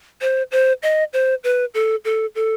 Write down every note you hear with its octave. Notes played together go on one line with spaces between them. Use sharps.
C5
C5
D#5
C5
B4
A4
A4
A4